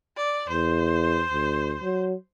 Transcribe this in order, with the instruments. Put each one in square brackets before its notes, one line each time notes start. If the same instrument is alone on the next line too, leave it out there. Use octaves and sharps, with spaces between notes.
[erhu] D5
[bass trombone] E2 [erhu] C5
[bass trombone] D2
F#3